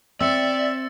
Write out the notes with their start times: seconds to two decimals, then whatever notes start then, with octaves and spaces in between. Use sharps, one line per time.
0.21 C4 D5 E5 E6 A6 C#7